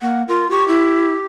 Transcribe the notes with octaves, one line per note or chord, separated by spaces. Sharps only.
A#3 F#5
F4 A#4
G4 C#6
E4